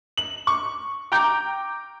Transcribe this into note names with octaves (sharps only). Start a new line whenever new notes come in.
F#7
C#6
G5 A#5 D6 G6